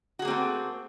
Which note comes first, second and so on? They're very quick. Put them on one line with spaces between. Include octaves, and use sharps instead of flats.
F#4 G#4 A#3 C4 A3